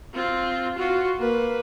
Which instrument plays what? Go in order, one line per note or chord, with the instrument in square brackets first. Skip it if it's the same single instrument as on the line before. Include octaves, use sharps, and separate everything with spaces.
[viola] C4 F4
F4 F#4
A#3 B4